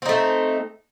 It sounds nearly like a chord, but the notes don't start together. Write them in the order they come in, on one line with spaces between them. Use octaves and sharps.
C4 D#4 A3